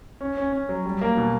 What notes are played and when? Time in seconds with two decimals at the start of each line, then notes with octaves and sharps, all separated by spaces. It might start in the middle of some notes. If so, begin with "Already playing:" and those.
0.21 C#4
0.37 C#4
0.53 C#4
0.69 F#3
0.85 G3
1.01 A#3
1.17 B2